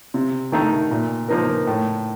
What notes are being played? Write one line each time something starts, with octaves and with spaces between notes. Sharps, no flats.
C3
D#3 A3 D#4
A#2
F3 A#3 D#4 A#4
A2